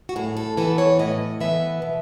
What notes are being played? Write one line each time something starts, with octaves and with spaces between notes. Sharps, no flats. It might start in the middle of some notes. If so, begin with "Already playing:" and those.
F#4
A2 G#4
A4
E3 B3 A4
C#5
A2 D#5
E3 B3 E5
B2